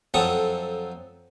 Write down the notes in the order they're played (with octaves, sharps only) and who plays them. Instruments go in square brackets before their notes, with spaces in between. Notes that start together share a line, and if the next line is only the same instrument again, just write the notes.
[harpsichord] F2 F#3 C4 A4 C#6 D#6